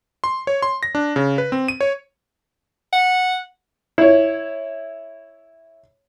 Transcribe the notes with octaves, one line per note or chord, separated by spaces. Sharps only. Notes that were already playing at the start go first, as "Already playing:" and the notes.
C6
C#5
C6
A#6
D4
C#3
B4
C4
D#7
C#5
F#5
E4 C#5